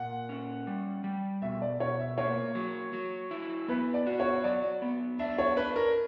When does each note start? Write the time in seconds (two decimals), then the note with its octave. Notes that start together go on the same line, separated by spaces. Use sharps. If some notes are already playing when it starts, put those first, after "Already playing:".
Already playing: A#2 F#5
0.29 C#4
0.67 G3
1.04 G3
1.42 B2 E5
1.62 D5
1.80 B2 C#5
2.00 E5
2.18 A#3 C#5
2.55 F#3
2.93 F#3
3.31 E4
3.68 B3 B4
3.94 D5
4.07 F#4
4.20 C#5
4.44 F#3 D5
4.82 B3
5.19 D4 E5
5.38 C#5
5.57 D4 B4
5.76 A#4